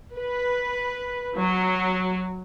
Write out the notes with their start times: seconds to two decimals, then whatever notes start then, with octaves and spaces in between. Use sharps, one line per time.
0.17 B4
1.36 F#3